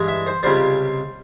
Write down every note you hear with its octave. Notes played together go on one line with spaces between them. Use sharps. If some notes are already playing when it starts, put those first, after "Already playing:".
Already playing: G2 E3 G#3
E5
C5
C#2 C3 G3 C5